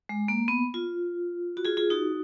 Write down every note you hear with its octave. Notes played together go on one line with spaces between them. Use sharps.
G#3
A#3
B3
F4
F#4
F4 G#4
F4 G#4
D#4 F#4